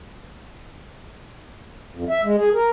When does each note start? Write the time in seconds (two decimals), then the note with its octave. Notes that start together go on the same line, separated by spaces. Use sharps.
1.94 F2
2.09 E5
2.24 G#3
2.38 G#4
2.54 A#4